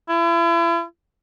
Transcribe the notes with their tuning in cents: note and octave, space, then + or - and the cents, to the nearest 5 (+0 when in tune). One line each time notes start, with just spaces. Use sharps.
E4 +40